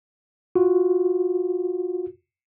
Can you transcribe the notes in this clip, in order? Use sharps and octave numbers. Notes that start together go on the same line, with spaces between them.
F4 F#4